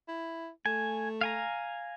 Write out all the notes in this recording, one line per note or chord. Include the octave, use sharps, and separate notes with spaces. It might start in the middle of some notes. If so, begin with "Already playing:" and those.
E4
A3 G#5
F5 G#5 A#5